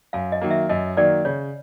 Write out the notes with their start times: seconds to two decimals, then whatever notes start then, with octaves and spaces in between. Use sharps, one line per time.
0.13 F#2 F5
0.32 D#5
0.41 D#3 F#3 A#3
0.51 E5
0.69 F#2 D#5
0.97 D#3 F#3 A#3 D5
1.25 C#3 C#5